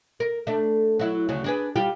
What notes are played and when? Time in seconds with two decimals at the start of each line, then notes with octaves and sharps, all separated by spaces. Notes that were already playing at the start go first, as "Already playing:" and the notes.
0.20 A#4
0.47 A3 D4
0.99 F#3 E4
1.29 D2 C#3 F#3
1.44 D4 G#4 B4
1.76 G3 F4 G4